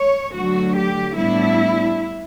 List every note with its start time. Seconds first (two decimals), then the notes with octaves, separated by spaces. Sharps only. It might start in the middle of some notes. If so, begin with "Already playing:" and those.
Already playing: C#5
0.33 D2 D3 F#3 F#4
0.75 G4
1.15 A2 G3 B3 D4 E4